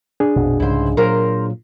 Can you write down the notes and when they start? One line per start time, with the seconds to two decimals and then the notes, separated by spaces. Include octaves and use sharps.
0.20 D4 G#4
0.36 A#1 F2 B2
0.60 C2 G#2 C#3 E4 C5
0.97 A#2 F#3 A#4 C5